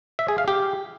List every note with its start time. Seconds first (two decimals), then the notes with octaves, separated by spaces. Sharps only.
0.19 E5
0.28 G#4
0.38 F5
0.48 G4